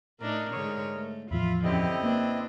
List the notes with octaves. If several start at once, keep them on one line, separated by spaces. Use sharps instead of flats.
A2 D4 D#4 A#4
G#2 D3 C#5 C#6 D#6
A3
E2 A2 F3 F4 E5 B5
F#2 D3 C4 E4 G4 D#5
A#3 D4 B4